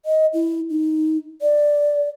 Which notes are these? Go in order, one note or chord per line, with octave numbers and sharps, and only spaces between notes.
D#5
E4
D#4
D5